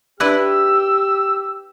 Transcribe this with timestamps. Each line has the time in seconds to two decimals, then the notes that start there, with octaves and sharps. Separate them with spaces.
0.20 D4 E4 G4 B4 E6